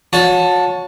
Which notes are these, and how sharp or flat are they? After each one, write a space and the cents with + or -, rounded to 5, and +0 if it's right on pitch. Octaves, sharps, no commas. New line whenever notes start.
F#4 -40 C#5 +0 A5 +0